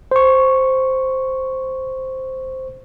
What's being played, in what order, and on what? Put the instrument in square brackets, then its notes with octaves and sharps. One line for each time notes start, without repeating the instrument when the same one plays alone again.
[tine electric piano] C5 C#6